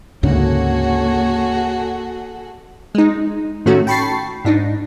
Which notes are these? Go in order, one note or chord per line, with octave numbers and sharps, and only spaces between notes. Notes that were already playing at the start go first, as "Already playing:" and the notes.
D2 G#2 C#3 A#3 F#4 G#4 A4 C#5
G#3 D#4
A2 D#3 A3 C#4 F#4
G5 A5 B5 C#6 A6 C7
G#2 D4 D#4